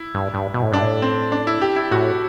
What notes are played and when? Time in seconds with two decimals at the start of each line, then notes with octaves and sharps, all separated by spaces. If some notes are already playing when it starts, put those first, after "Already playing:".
Already playing: E4
0.15 G2
0.34 G2
0.54 B2
0.63 A2
0.72 G2 D4
0.82 A2
1.02 C4
1.32 D4
1.47 E4
1.61 G4
1.76 E4
1.91 A2 F#4